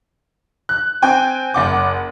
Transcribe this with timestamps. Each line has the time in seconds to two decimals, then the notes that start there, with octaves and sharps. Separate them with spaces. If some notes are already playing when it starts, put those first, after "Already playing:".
0.69 F#6
1.02 C4 G5 G#5
1.54 F#1 F#5 D6